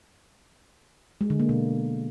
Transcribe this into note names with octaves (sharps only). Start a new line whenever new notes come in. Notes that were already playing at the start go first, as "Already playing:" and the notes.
G#3
D3
A#3
B2